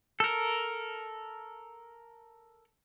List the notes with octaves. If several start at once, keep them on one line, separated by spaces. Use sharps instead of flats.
A4 A#4